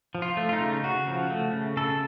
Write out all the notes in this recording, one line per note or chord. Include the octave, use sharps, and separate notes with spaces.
F3
F4
A3
F4
D#4
C#3
C#3 F#4
F3
A3
C#3
C#3 A4